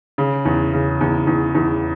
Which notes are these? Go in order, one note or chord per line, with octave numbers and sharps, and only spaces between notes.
C#3
E2
C#3
E2
E2
E2